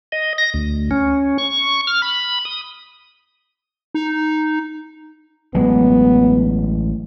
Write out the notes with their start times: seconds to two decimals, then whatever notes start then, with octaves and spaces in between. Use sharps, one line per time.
0.12 D#5
0.38 A#6
0.54 D2
0.91 C#4
1.38 C#6
1.87 F6
2.02 B5
2.45 D#6
3.95 D#4
5.55 A1 F#3 G#3 B3